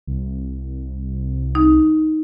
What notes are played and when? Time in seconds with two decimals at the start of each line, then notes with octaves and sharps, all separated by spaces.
0.07 C2
1.55 D#4